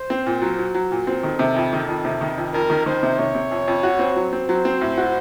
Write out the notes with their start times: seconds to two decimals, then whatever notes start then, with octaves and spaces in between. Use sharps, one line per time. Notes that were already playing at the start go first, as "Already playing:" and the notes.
Already playing: C5
0.10 C4
0.26 A#2
0.42 F#3
0.59 F#3
0.75 F#3
0.92 A#2
1.07 C4
1.23 D#3 A4
1.39 C3
1.56 F2
1.73 D#3
1.89 F2
2.05 C3
2.21 D#3
2.38 F2
2.53 F2 A#4
2.70 D#3
2.86 D#3 C5
3.03 C3
3.19 C3 C#5
3.35 C3
3.51 F2
3.68 F2
3.83 F#4
3.99 C4
4.16 F#3
4.33 C4
4.49 F#3 C5
4.65 C4
4.81 A2
4.97 F#4